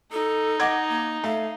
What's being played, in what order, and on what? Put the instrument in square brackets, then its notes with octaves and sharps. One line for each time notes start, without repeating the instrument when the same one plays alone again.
[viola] D#4 [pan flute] A4
[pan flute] D#5 [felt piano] F#5 D6 G#6
[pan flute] A#3
[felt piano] A3 [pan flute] F5